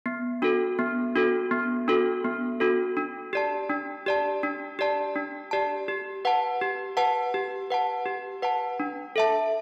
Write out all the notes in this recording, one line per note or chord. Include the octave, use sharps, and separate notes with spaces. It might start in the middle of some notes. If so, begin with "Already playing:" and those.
B3
D4 F#4 A4
B3
D4 F#4 A4
B3
D4 F#4 A4
B3
D4 F#4 A4
D4
G4 D5 A5
D4
G4 D5 A5
D4
G4 D5 A5
D4
G4 D5 A5
G4
B4 F#5 A5
G4
B4 F#5 A5
G4
B4 F#5 A5
G4
B4 F#5 A5
D4
A4 E5 A5